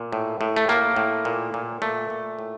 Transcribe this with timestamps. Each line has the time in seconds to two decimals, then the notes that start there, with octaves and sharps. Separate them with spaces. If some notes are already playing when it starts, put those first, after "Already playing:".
Already playing: A#2
0.12 A2
0.41 A2
0.56 A3
0.69 A2 A#3
0.96 A2
1.25 A#2
1.54 A#2
1.82 A#2 A3
2.10 A#2
2.39 A2